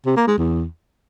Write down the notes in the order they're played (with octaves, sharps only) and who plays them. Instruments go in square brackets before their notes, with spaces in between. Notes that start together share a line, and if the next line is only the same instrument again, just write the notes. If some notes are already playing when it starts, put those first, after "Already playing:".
[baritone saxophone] C3
A#3
G#3
E2